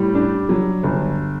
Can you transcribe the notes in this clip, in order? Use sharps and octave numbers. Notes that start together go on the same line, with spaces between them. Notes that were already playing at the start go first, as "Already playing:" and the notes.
Already playing: A2 G3
D4
F#3
G1